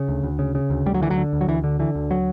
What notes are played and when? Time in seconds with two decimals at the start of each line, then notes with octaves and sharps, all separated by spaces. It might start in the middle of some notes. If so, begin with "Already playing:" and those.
Already playing: C#3
0.08 D2
0.23 D2
0.39 C#3
0.55 C#3
0.70 D2
0.86 D2 G3
0.94 F#3
1.01 D3 E3
1.10 F#3
1.17 D3
1.33 D2
1.41 F#3
1.48 D2 E3
1.64 D3
1.79 D3 E3
1.95 D2
2.11 F#3